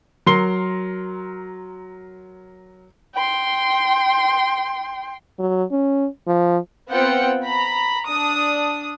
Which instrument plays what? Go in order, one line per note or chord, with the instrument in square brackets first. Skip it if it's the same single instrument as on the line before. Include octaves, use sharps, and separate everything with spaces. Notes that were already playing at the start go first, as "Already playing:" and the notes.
[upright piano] F#3 A#4 C6 C7 G7
[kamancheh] G5 C6
[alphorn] F#3
C#4
F3
[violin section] B3 C4 F4 F#5 G5 C#7
A#5 B5
D4 D#6